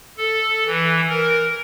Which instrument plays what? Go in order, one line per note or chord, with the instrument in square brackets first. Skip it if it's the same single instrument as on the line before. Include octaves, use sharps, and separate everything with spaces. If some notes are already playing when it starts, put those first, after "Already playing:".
[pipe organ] A4
E3
A#4